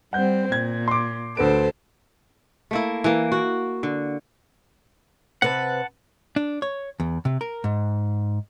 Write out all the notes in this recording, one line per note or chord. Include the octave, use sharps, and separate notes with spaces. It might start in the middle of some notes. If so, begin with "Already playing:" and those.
G3 C4 F#5 G6
A#2 G#6
C6 D6
D2 A4 B4 C5 D7
A3 A#3 E4
E3 A#3
F#4
D3
C3 B4 F#5 A5
D4
C#5
E2
C3
A#4
G#2